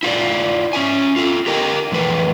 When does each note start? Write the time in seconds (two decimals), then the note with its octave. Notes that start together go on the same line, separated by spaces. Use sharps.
0.03 E4 F4 C5 D5
0.73 C#4 D4 E5 G#5
1.16 F4 A4
1.46 G4 A#4 D#5 G5
1.92 F2 A2 E3 B4 G5